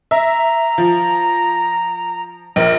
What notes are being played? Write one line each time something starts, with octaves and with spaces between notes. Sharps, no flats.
E5 A#5
F3
A#1 A#4